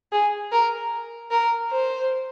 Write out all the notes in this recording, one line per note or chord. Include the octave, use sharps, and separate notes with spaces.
G#4
A#4
A#4
C5